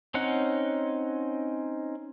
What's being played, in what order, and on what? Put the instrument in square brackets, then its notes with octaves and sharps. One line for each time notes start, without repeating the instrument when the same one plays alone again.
[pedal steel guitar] C4 C#4 D#4 F#5